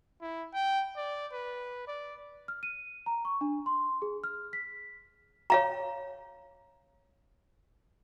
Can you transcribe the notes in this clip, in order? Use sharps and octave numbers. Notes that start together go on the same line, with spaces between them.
E4
G5
D5
B4
D5
F6
D#7
A#5
C#6
D4
C6
G#4
F6
B6
C#5 F5 A#5